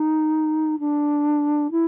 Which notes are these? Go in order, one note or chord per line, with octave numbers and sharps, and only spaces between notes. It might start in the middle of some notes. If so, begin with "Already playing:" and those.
Already playing: D#4
D4
E4